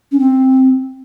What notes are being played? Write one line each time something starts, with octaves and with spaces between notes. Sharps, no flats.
C#4
C4